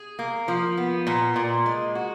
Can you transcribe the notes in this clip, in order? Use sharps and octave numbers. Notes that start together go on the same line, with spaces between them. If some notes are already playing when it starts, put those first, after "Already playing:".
Already playing: G#4
A#3
F3
B3
A#2
A#2
G#3
F#4